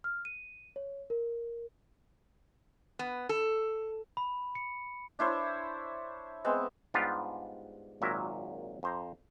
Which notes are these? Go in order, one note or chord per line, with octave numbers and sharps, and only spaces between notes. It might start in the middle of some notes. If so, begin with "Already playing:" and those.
F6
D#7
C#5
A#4
B3
A4
B5
C#7
D4 E4 C5 C#5
G#3 B3 C4
G#2 G3 B3 D4 F4 G4
G#1 A#2 F#3 A#4 E5
F2 C5 A#5